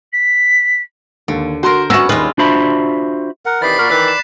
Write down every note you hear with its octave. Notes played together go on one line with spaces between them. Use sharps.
B6
D#2 D3
F#4 A#4 C5 C6
B3 C#4 F#4 E6 A#6 E7
D#2 G3 G#3 F4 B4
D4 F4 F#4 C5 E5 B5
A#4 F#5
C3 D#3 E3 D5 B5 A6 B6 C7
A#2 F#4 A#4
D#3 E3 F#6 B6 C7
E7